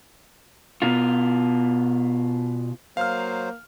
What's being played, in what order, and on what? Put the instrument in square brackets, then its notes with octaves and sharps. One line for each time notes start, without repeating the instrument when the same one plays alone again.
[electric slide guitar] B2 F4
[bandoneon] F#3 C5 [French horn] A#3 [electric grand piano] F5 F6